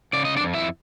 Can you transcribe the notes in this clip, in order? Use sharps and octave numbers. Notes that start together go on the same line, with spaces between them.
C#3 D5
D#5
D4 D5
F2
E4 E5